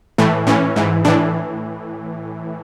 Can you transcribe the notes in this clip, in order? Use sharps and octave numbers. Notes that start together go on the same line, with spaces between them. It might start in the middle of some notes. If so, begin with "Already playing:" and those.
A2 E3 A3
A2 E3 C#4
G#2 E3
A2 E3 D4